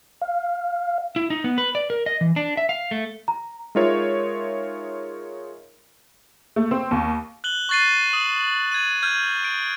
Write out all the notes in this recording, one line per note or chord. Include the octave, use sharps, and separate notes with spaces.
F5
E4
D#4
B3
B4
D5
A#4
D#5
E3
D4
E5
F5
A3
A#5
G#3 D#4 F4 A#4 C#5 E5
A3
C4
D#2
F#6 F#7 G7
C#6 F#6 A6 C7 D#7
D#6
G#6 D#7
F6 G6 G#6
D7